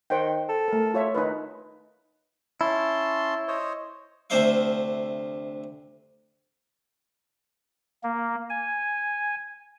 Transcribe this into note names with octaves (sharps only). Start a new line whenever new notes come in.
D#3 C5 F#5 G5
A4
A3 A#4
F4 C#5 E5
D#3 D#4 B4
C#4 E4 A5 C6
C5 C#5 D#5
D2 C3 D4 C5 E5 F5
A#3
G#5